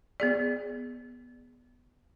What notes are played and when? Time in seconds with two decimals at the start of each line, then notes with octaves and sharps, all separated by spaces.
0.20 B3 G#4 D5